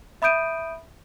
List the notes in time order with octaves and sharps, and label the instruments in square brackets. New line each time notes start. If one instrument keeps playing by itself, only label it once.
[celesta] E5 B5 D#6 G6 D7 D#7